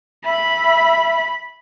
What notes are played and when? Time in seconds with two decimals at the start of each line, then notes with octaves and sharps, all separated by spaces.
0.25 E5 B5